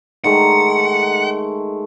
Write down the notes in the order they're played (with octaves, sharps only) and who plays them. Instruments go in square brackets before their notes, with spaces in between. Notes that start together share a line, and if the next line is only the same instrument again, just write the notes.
[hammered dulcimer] D#3 G#3 A3 [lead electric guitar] F#5